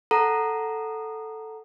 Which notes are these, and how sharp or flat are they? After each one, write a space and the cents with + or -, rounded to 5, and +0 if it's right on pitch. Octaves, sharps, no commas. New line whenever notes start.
A4 +0 F#5 +0 A#5 +0